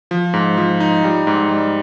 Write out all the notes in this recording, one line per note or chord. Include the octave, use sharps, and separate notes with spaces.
F3
G#2
F3
D#4
G3
G#2
G3